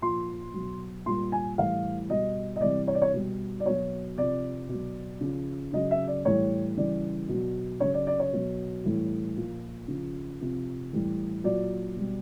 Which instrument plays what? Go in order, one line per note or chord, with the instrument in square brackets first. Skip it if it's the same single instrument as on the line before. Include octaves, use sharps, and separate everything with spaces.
[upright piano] A#2 F3 C6
B2 F#3
A#2 G3 C6
G#5
A2 E3 G3 F5
B2 G3 D#5
D#5
C3 E3 G3 D5
C#5
D5
C#5
B2 G3
D5
B2 F#3 C#5
C3 F3 D5
B2
F#3
C#3 F3
C#3 F#3 D#5
E5
D5
A2 E3 G3 C#5
C#3 E3 G3 D5
B2
F#3
C#3 F#3 C#5
D5
D5
C#5
B2 F#3
A2 E3 G3
A#2 F3
C#3 F3
C3 F3
A2 E3 G3
A#2 F#3 D5
B2 G3